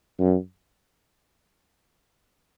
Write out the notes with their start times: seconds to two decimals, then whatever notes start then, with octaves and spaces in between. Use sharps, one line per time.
0.20 F#2